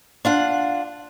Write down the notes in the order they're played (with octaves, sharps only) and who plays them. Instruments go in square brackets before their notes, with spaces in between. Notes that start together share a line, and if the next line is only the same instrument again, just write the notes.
[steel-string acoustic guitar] D4 F4 F#5